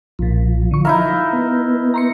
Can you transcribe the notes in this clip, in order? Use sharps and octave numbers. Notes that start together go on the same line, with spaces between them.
B1 A#2 F3
D3 C#6
D#4 E4 A#4 E5 F5
B3
A#5 C6 C#7